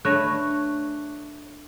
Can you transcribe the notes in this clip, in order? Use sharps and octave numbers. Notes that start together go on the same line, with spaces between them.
A3 D4 B4 C#5 F#6 A#6